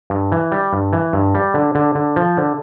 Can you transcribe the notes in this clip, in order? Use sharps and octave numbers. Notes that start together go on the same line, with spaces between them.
G2
E3
G3
G2
E3
G2
G3
D3
D3
D3
F3
D3